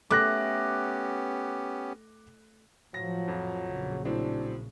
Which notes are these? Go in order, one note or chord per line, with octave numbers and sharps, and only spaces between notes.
A3 B3 C#4 G4 D6 F#6 A#6
A2 F3 F#3 A#6
F2
A#1 C#3
A2 F#3 C4 D4